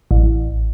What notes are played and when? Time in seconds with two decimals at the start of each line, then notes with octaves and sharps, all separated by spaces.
0.11 A1